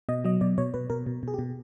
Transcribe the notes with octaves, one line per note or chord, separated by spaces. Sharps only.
B2 D#5
F#3 D#5
B2 D5
B2 C#5
B2 B4
B2 A#4
B2
B2 G#4
G4
B2